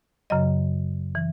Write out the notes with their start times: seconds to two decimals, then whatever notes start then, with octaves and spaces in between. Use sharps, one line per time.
0.30 F#2 C#3 F#3 D#5
1.15 E3